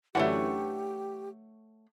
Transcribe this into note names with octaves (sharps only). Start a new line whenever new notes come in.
F#2 D3 E3 A3 G4 C#5 F#5